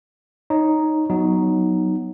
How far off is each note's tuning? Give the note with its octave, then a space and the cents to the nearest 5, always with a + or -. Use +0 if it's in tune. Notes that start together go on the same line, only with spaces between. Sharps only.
D#4 +0 C#5 +0
F#3 +0 B3 +0 D#4 +0